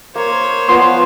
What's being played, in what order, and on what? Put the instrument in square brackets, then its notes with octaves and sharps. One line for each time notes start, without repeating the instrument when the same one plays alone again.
[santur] A#3 [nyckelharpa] C5 C#5
[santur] F3 D5 [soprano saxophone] B3 [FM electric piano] C6